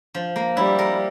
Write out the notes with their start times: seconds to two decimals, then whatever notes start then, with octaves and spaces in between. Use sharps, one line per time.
0.15 F3
0.36 A#3
0.57 G3 E4
0.79 A#4